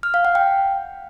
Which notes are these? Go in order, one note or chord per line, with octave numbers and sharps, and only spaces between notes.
F6
F5
F#5
G5